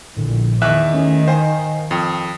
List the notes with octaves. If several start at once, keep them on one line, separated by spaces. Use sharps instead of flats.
A#1 A2 D3
E2 D#3 E5 C#6 D6 F#6
A3 C#4
C5 F5 G5 G#5
F2 G5 D#6 C7